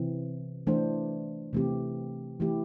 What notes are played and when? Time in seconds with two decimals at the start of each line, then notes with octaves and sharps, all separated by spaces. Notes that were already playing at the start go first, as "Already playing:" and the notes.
Already playing: C3 E3 C4
0.67 E3 A3 D4 C5
1.53 C3 E3 A3 C4 G4
2.40 E3 A3 E4 G4